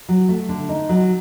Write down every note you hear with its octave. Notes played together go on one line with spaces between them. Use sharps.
F#3
A3
D3
D#4
F#3